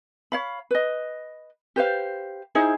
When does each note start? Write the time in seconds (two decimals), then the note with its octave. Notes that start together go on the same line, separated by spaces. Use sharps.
0.32 C#5 F5 B5
0.71 B4 D#5
1.76 G4 B4 C5 F5
2.55 D#4 E4 G#4 C5